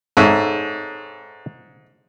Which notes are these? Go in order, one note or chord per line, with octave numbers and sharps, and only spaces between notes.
G#2 A4 C#5 E5